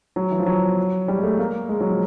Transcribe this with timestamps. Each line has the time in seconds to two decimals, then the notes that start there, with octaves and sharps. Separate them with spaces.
0.16 F#3
0.31 E3
0.39 F3
0.46 F#3
1.08 G3
1.18 G#3
1.23 A3
1.39 A#3
1.69 G#3
1.80 F#3
1.90 F3